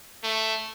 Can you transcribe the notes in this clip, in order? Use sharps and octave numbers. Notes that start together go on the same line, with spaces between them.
A3